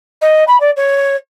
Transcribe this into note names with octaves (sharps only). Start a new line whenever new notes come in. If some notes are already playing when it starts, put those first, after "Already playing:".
D#5
B5
D5
C#5